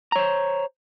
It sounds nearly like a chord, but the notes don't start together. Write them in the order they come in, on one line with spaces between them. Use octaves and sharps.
A#5 C#5 C5